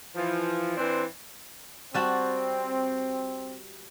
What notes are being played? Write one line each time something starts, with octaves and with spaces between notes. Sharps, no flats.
E3 F3
E3 C4 D4 B4 C5
G3 C4 F#4 A5